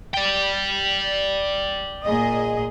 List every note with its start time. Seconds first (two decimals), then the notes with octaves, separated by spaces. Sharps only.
0.14 D5 G5
2.04 A#2 G#4 D#5